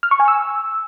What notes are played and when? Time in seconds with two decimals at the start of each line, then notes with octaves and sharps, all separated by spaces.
0.03 F6
0.11 C#6
0.20 G#5
0.28 E6